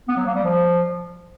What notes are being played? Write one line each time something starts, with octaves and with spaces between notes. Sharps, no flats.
B3
F#3
A#3
G3
F3